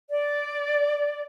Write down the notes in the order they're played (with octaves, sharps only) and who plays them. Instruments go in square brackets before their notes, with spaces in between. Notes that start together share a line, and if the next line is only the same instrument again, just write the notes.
[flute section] D5